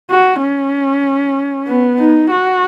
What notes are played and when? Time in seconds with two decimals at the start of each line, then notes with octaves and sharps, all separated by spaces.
0.11 F#4
0.42 C#4
1.67 B3
1.98 D#4
2.31 F#4